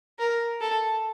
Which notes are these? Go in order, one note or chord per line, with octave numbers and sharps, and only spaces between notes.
A#4
A4